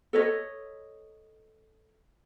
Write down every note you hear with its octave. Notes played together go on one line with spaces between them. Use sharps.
A4 B4 C#5 D#5